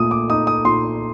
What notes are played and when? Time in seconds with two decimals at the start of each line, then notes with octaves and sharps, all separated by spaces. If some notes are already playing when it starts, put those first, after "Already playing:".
Already playing: A#2 A3 D#6
0.11 D6
0.30 D#4 D#6
0.47 D#6
0.65 A#2 C6